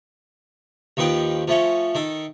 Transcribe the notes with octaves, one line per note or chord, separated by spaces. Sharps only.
D#2 D#3 F3 B4 G5
F3 A3 C#4
D#3 A4